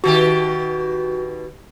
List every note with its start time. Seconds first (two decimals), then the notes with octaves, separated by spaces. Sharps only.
0.04 B2 D#3 F#4 G4